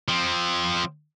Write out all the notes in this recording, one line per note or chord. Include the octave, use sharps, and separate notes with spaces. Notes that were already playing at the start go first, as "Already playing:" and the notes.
F3 C4